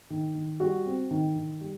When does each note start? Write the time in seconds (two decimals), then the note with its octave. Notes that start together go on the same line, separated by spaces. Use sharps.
0.10 D#3
0.35 D#3
0.60 G3 F#4
0.86 C4
1.11 D#3
1.35 D#3
1.61 G3